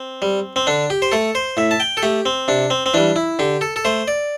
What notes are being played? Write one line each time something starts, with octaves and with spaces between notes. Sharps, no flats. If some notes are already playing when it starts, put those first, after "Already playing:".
Already playing: C4
G3
C4
D3 D4
G4
C5
A3 A4
C5
A2 E5
A5
G5
A4
A3 G4
C4
C3 D4
C4
C4
E3 G3 D4
E4
D3 G4
A4
A4
A3 C5
D5